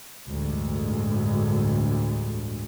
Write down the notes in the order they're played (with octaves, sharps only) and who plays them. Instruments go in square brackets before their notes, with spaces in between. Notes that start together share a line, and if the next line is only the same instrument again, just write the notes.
[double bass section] A1 D2 G2 G#3